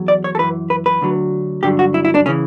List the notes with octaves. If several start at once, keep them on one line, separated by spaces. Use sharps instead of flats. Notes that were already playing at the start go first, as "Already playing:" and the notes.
Already playing: E2 F#3
D5
C#5
A4
F#2 E3 B4
B4
B4
D2 D3 F#3
G2 D3 F#3 G4
F#4
E4
E4
D4
C#3 E3 C#4